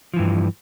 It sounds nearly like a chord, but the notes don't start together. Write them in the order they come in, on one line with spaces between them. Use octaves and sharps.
F3 E3 G2